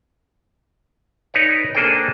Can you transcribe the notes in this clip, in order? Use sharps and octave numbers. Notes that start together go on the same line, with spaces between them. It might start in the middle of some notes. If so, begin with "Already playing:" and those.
D#4 B4 C#5 D5
A#3 D4 G#4 A4 C5 G5